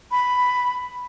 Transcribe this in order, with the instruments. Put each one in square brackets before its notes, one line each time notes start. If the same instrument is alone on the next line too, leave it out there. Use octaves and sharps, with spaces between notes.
[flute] B5